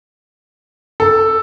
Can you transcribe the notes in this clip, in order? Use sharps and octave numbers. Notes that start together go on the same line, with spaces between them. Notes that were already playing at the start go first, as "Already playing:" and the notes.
A4